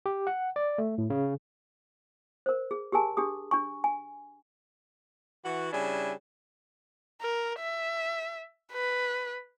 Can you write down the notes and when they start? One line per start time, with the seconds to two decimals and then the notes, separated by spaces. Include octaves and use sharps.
0.06 G4
0.27 F#5
0.56 D5
0.78 A3
0.98 A2
1.10 C#3
2.46 A#4 C5
2.71 G#4
2.92 G4 G#4 A#4 G#5 A5
3.17 D4 G4 G#4 D#6
3.51 D4 G#5 C#6
3.84 G#5
5.45 E3 F#4
5.73 C#3 G3 D4 E4 G#5
7.22 A#4
7.59 E5
8.73 B4